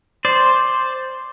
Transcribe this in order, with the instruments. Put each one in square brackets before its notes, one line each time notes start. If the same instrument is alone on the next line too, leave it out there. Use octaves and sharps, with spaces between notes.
[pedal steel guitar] C5 D5